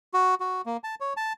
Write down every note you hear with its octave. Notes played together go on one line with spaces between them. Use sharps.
F#4
F#4
A#3
A5
C#5
A5